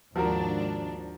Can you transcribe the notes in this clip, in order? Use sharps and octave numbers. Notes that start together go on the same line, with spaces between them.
D#2 G#2 F3 D4 F#4 A#4